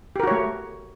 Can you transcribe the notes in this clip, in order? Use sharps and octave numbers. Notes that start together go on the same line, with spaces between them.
A3 F#4 G4 A#4 C#5